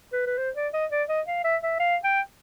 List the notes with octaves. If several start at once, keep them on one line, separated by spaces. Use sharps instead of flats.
B4
B4
C5
D5
D#5
D5
D#5
F5
E5
E5
F5
G5